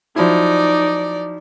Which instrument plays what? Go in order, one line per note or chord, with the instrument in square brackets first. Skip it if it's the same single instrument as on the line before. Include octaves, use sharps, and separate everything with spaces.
[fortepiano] F3 F#3 E4 [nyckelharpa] D#4 [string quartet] D5